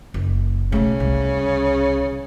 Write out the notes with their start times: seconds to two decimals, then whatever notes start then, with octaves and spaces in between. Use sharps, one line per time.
0.14 F#1
0.72 B1 C#3 A3
1.00 C2